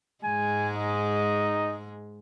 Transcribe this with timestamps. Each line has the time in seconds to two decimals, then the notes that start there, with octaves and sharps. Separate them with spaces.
0.24 G#2 G#3 G#5
0.75 D#4